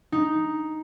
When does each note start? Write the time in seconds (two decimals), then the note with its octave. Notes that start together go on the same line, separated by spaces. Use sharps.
0.12 D#4